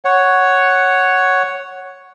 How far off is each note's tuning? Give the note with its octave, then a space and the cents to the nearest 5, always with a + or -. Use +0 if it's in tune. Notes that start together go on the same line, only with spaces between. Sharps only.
C#5 +0 F#5 +0